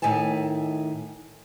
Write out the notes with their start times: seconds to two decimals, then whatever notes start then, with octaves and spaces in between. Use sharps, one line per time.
0.02 A2 D#3 E5 G#5 A5